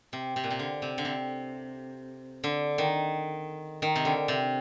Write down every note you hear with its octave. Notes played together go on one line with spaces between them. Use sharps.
C3
C3
A#2
C3
D3
C3
D3
C3
D3
D#3
D#3
C3
D3
C3